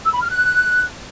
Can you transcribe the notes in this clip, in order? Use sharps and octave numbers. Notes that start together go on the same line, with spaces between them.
E6
B5
F6
F#6